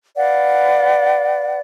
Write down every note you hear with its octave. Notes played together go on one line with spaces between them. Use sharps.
B4 D5 F5 F#5